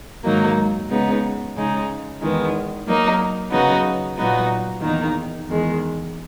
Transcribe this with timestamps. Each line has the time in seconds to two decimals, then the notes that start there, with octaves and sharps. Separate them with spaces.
0.24 G#2 D#3 F#3 A#3 D#4
0.90 C#3 G#3 B3 D#4
1.55 C#3 G#3 D#4
2.21 E2 D#3 G#3 B3
2.87 F#3 A#3 D#4 A#4
3.51 C#3 F#3 B3 D#4 F#4
4.18 A#2 F#3 B3 D#4 F#4
4.82 E2 D#3 A#3 D#4
5.48 E2 D#3 G#3